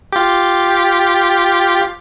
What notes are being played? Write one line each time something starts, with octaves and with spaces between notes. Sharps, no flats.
F4 G4